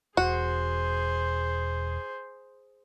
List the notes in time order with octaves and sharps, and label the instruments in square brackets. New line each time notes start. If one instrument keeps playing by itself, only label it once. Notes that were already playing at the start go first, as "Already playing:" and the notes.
[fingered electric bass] E1 [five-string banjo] F#4 [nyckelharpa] G#4 C5